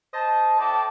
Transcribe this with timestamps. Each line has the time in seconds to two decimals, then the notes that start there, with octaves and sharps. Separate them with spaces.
0.14 C5 D#5 A5
0.60 A2 D5 A5